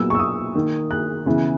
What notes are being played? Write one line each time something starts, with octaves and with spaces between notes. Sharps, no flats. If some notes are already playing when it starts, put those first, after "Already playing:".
Already playing: A#2 F#3 B3 E6
C#6
E6
D#6
D#3 A#3
F#6
C#3 E3 B3